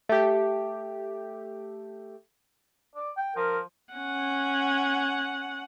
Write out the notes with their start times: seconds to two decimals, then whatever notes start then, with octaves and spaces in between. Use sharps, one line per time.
0.09 A3 G4
2.95 D5
3.17 G5
3.36 F3 A#4
3.93 C#4 F#5